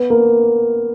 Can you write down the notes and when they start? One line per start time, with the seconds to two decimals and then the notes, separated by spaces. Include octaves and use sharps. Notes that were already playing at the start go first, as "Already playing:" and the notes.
Already playing: B3
0.10 A#3